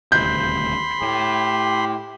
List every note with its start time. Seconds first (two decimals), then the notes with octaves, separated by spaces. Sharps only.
0.12 D#1 D2 C3 B5 C6 G6
1.02 A2 G4